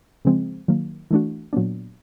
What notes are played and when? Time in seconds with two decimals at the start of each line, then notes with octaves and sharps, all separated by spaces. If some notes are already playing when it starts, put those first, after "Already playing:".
0.25 C#3 F3 G#3 C4
0.68 D#3 F#3 A#3
1.11 E3 A3 D4 F#4
1.53 A#2 F#3 B3 D4